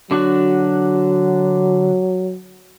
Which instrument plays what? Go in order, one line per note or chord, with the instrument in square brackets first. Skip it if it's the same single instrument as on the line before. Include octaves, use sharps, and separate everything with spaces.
[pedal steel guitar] D3 D4 F#4 [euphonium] F#3